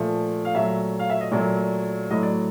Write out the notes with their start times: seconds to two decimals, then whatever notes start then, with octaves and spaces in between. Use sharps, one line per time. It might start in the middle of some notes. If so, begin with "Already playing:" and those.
Already playing: A#2 F3 A3
0.45 F5
0.55 A#2 F#3 A3 E5
0.99 F5
1.10 E5
1.21 D#5
1.32 A#2 F#3 A3 D5
2.10 A2 F#3 A3 D#5
2.23 D5